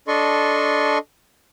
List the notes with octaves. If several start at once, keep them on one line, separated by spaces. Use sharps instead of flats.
D4 A4 D#5 C6 C#6